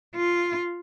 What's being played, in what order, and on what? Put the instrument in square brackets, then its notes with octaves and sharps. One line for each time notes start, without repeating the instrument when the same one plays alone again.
[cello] F4